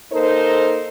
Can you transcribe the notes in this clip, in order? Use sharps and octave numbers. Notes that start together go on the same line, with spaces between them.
A#3 D#4 A4 A#4 C5